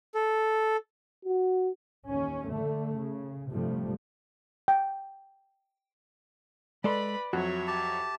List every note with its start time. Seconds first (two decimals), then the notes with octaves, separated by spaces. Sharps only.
0.15 A4
1.25 F#4
2.09 D#2 C#4
2.49 D3 A3
2.95 C#3
3.50 G2 C3 F3 G3 A3
4.68 G5
6.84 G#3 A4 B4 D5 B5 C6
7.33 F2 F#3 F#4 C#5 E5
7.67 G4 A5